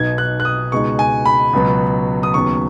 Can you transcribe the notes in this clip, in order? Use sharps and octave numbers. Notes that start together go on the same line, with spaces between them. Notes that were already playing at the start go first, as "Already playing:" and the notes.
Already playing: B1 B2 B3 D#4 G#6
F#6
F#6
D#6
C#2 B2 G#3 D#4 C#6
G#5
B5
C#2 B2 F#3 B3
D#6
D#2 C#3 F#3 B3 C#6